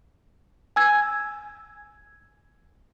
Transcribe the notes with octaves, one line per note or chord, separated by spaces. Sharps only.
G#5 E6 G#6